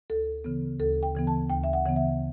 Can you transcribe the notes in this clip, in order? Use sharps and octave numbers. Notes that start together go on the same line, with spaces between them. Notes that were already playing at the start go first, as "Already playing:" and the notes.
D2 A4
C#3 E3 B3
D2 A4
G5
C#3 E3 B3
A5
D2 G5
E5
F#5
C#3 E3 B3
E5